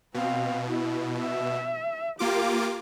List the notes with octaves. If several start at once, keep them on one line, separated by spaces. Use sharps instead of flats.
B2 C4 F5
E4
E5
A#3 F4 G4 D6